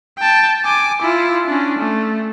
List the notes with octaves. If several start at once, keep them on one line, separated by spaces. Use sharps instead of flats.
G5 A5
G#5 D6
E4 F4
C#4 D4
A3